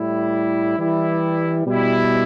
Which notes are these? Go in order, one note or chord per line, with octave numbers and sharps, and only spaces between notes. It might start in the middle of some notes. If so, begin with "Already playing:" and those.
Already playing: A2 G3 E4
E3 G3 E4
B2 G3 E4